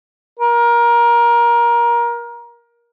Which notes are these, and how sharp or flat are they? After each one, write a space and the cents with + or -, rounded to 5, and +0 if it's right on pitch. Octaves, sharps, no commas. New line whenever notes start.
A#4 +20